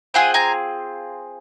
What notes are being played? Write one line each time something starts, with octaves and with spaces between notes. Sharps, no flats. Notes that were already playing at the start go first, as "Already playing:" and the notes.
C4 F4 G#4 F#5 G#5
G#5 A#5